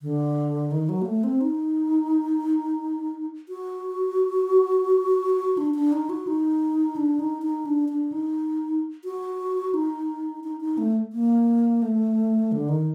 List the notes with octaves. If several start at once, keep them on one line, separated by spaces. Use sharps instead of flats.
D3
D#3
F#3
A#3
A3
C4
D#4
F#4
D4
D4
D#4
F#4
D#4
D4
D#4
D#4
D4
D4
D#4
F#4
D#4
D#4
D#4
A3
A#3
A3
D3
D#3